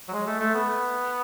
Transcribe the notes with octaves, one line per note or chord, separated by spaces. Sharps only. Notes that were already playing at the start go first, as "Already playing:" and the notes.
F#3
G#3
A3
A3
B3